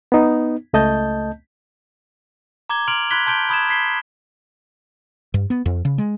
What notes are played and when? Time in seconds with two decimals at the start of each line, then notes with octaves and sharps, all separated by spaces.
0.12 B3 D#4
0.73 C#2 A3 D#5 A5 G6
2.69 A#5 D6 G#6 G7
2.88 C6 F6 D7 F7 F#7
3.10 B5 C6 F#6 G#6 B6 G7
3.26 A5 C6 G6 D7 G7
3.49 B5 D#6 G#6 E7
3.69 G#6 B6 C7 G7
5.34 G2
5.50 B3
5.66 F2
5.85 C#3
5.98 G#3